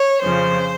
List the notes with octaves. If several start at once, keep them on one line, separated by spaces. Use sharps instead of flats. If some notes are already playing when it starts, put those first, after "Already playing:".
Already playing: C#5
F2 C#3 F3 C5